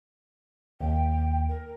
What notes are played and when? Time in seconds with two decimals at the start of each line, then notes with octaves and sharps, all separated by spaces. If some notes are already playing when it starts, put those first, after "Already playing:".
0.81 D#2 G5
1.49 A#4